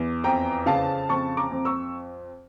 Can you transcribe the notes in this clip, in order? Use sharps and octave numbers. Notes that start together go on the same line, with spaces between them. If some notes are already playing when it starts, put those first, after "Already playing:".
Already playing: E2
F2 G5 A#5
C#3 F5 A5
F2 A5 C#6
A#5 D6
F2
C#6 E6